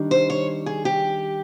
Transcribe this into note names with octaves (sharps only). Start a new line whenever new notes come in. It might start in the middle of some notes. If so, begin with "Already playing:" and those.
Already playing: D#3 G3 D4
C5
C#5
G#4
G4